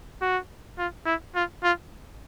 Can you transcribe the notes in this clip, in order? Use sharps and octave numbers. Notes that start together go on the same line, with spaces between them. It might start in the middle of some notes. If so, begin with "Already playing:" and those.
F#4
F4
E4
F4
F4